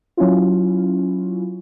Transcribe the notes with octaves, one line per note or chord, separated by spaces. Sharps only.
F#3 C#4 E4 F4